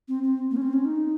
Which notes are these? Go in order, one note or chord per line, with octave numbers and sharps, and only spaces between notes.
C4
C4
A#3
C#4
C4
C#4
D#4